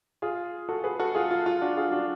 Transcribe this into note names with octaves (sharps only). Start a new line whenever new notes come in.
F4 G#4
F#4 A4
G#4 B4
F#4 A4
F4 G#4
F4
F4
D4 F#4
F4 G#4
D4 F#4